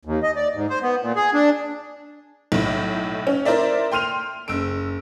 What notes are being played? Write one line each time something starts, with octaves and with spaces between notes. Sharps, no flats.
D#2
D#5
D5
G#2
C5
B3
A#2
G#4
D4
B1 A2
C#4
E4 A#4 C5 D5 E5
G5 C6 F6 D#7 F7
F#1 E6 D7